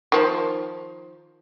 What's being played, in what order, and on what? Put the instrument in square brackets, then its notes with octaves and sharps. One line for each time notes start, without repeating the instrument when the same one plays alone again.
[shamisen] D#3 F3